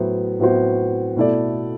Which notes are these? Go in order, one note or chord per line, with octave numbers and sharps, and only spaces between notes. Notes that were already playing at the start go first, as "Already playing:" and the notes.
Already playing: A2 F#3 B3 F#4 C5
A2 F#3 B3 F#4 C5
B2 A3 E4 A4 D5